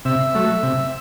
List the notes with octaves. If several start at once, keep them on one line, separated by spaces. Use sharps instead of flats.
C3 E5
F#3 A3
C3